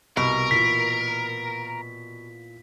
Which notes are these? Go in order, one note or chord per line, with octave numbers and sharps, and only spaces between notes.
C2 B2 A#4
A#2 E3 F4 B6